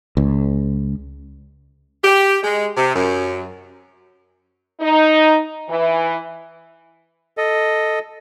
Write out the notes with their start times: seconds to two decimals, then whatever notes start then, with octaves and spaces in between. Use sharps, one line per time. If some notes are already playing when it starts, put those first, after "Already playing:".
0.17 C#2
2.03 G4
2.43 G#3
2.75 C3
2.94 F#2
4.81 D#4
5.68 E3
7.37 A4 D#5